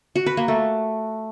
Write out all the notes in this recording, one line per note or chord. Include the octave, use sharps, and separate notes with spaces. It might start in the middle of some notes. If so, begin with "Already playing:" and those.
F#4
B4
A#3
A3